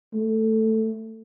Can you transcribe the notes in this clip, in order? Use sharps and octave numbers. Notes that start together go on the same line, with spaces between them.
A3